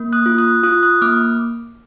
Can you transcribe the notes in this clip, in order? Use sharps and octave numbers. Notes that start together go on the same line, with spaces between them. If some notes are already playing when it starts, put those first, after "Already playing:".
Already playing: A#3
D#6 F#6
F4
D#6 F#6
F4 D#6 F#6
D#6 F#6
A#3 D6 F6